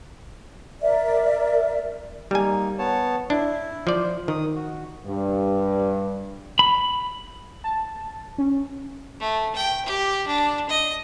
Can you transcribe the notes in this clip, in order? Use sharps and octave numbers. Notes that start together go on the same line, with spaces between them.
A#4 D5 E5
G3 A#3 D#4 G#5
B3 C#5 A5
D4 E4
F3 C5 D5
D#3 D#6
F#4
G2
B5
A5
C#4
A3
G5
G4
D4
D#5